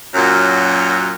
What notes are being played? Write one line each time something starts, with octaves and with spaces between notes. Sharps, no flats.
F#2 A#2 F#3